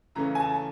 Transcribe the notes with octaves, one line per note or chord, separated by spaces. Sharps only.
C#3 E3 A3 C#4 A#5
G#5
A5